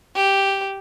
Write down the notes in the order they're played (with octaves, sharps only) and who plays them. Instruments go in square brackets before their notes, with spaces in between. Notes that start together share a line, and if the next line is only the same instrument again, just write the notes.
[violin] G4